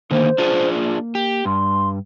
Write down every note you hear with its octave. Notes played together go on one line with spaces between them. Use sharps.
D3 D#3 A#3 C5
D4 F4 G#4
A#3
G4
G2 C6